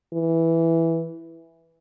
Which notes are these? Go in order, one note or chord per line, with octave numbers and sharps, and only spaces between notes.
E3